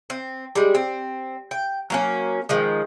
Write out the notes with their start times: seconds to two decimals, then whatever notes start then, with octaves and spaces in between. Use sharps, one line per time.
0.10 C4
0.55 G3 G#3
0.75 C4
1.51 G5
1.90 F#3 A#3 C#4
2.49 D#3 F3 G#3